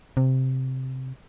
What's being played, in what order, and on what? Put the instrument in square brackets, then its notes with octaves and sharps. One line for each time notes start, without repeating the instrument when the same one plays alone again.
[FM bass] C3